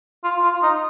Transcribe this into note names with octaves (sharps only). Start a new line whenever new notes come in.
F4
F4
D#4